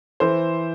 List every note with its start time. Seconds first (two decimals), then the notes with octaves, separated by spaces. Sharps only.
0.20 E3 C5